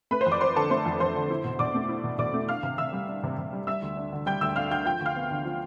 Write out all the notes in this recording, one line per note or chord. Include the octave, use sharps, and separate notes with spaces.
A3 B4 B5
C5 C6
F2
D5 D6
F2 C5 C6
D3 A4 A5
A3 C5 C6
F2
F2 C5 C6
D3
E4
B2
B2 D5 D6
A3
E4
B2
B2 D5 D6
A3
D4 F5 F6
C3
C3 E5 E6
G3
D4
C3
C3
G3
G3 E5 E6
D2
D4
D3
G3 G5 G6
D2 E5 E6
D4 F5 F6
D3 G5 G6
F3 G5 G6
D2
F5 F6
B3
D3
F3